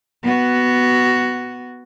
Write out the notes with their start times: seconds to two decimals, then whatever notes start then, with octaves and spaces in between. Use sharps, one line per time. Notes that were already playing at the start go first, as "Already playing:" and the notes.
0.23 B3 F#4